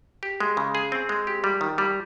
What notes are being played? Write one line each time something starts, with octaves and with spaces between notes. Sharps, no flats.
G4
G#3
C#3
G#4
C4
G#3
G4
G3
D#3
G3